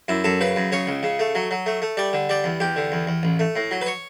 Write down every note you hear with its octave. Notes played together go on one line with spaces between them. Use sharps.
F#2 E4
F#2 A4
C#3 B4
F#2
C#3 C#5
C#2
C#3
A3
F#3
F#3
A3
A3
G3 D5
D3
G3 D5
E2
E2 G4
D3
E2
E2
A1
A3
A2
F#3
B4
C#5